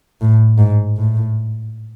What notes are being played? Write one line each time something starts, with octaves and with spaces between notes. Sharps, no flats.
A2
G#2
A2